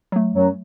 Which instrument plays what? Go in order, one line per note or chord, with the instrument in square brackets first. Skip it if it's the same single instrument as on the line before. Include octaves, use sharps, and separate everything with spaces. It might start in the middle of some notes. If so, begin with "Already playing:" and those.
[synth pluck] F#3 A3
[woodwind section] F#2 F#3